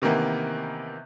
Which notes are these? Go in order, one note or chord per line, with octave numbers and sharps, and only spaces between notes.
C3 D#3 E3 A#3 B3